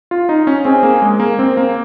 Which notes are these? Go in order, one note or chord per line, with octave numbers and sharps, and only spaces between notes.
F4
D#4
C#4
C4 G#4
A#3
G#3
A#3
C4
A#3